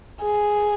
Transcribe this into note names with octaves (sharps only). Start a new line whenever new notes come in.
G#4